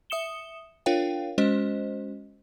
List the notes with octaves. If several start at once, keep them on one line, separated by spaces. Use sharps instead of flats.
E5 D#6 C#7 E7 G7
D4 F4 A#4 C#5 F5 G5
G#3 C#4 F#4 C5 D#5